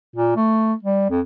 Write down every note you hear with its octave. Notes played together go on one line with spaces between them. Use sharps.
A#2
A3
G3
F2